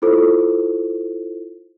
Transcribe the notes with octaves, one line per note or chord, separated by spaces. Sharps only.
E4 F4 A4 C5